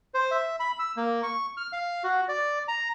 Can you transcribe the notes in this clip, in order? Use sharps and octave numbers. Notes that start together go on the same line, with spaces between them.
C5
E5
B5
E6
A#3
C#6
F6
F5
F#4
D5
A#5